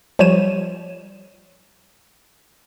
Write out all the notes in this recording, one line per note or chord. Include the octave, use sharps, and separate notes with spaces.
F3 G3 C5 C#5 D#7 E7